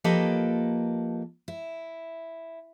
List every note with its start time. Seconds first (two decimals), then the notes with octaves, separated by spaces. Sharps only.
0.04 F3 A#3 G4 A4 B4 D#5
1.48 E4